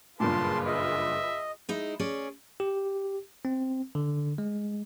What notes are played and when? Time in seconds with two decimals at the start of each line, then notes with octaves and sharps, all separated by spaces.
0.20 F#1 G2 A#2 F4 G#4 B4 A5 C6
0.67 D#5 E5
1.69 G#3 D#4 E4
2.00 C#4 G#4 D5
2.60 G4
3.45 C4
3.95 D3
4.38 G#3